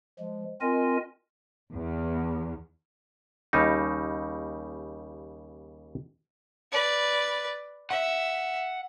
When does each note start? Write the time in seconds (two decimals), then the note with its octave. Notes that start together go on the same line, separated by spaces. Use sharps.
0.19 F3 G#3
0.61 C4 F4 A#4 D#5 G#5
1.73 E2
3.53 D#2 C#3 G3 D#4
6.72 B4 D5
7.91 E5 F#5